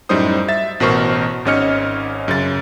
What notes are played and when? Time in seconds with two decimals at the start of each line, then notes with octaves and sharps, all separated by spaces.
0.09 F#2 A2 G3 D#4 C5 D#6
0.48 E5 A6
0.80 A1 B2 A#4 C5 C#6
1.45 G#1 G#2 C#4 D#5 F6 C#7
2.28 F#2 C#3 A6